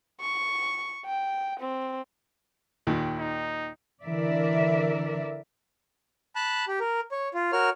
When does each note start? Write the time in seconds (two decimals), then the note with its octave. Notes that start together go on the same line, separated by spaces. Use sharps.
0.20 C#6
1.05 G5
1.60 C4
2.87 D#2 A#2 D#3
3.18 D#4
4.03 D3 E3 A#4 D5 E5
6.36 A5 B5 F#6
6.68 G4
6.80 A#4
7.12 C#5
7.34 F4
7.52 F#4 A#4 C#5 F6